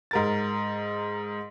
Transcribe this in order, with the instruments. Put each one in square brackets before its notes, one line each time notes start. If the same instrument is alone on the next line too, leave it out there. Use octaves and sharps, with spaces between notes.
[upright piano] G#2 A#4 A6